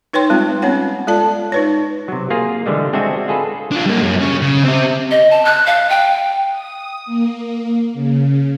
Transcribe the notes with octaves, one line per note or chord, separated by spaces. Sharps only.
D#4 B4 C#5 G5 C6
G3 G#3 C4 F4
B3 C#4 C#5 F#5
G#3 F4 A4 D5 A5
D#4 B4 C#5
C3 F#3
A#3 F4 G#4
D3 E3 G3 G#3
G#3 C4 D4 F#4 E5 G#5
F4 G#4 A4 B4
D4 F4
G3 A#3
F#2
C#3
C#3
C4 G4
D#5
A5
F#6
F5
G5
D#6
A#3
C#3